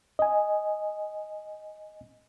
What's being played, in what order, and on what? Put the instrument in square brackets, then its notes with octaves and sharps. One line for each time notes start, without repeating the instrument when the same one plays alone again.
[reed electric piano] D#5 G#5